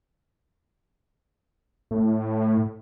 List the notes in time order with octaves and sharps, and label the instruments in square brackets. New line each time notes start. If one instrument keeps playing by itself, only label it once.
[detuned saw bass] A2